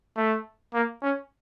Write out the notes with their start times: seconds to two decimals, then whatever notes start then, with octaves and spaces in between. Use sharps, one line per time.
0.17 A3
0.74 A#3
1.02 C#4